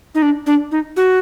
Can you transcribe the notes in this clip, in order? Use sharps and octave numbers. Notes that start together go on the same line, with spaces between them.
D#4
D4
D4
D#4
F#4